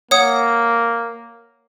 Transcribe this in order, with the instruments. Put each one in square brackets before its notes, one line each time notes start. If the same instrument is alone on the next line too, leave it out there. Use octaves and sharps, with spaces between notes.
[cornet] A#3 [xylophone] C#5 F#5 D#6